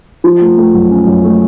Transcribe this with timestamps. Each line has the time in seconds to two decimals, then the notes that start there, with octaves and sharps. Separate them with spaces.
0.24 F3
0.41 A3
0.58 A3
0.74 F#2
0.90 C#4
1.07 F#2
1.24 A3